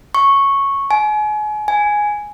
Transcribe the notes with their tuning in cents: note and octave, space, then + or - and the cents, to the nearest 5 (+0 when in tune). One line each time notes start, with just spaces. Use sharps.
C#6 -5
G#5 +35
G#5 +0